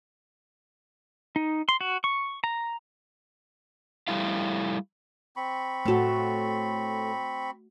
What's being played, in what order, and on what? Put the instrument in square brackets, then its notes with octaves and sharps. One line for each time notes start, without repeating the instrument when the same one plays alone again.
[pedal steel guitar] D#4
C6
F#4
C#6
A#5
[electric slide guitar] G3 A3 E4 F5
[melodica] C4 B5 C#6
[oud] A2 A4 [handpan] A3 F#4